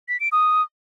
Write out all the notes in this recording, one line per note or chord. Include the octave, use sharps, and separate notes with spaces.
B6
D7
D#6